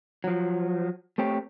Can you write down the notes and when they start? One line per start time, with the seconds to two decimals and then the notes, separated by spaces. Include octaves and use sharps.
0.24 F3 F#3
1.18 A3 C4 G4 C#5